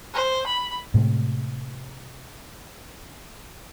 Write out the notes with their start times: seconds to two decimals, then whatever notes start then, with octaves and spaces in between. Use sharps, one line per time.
0.14 C5
0.46 B5
0.94 A2 C3 G#3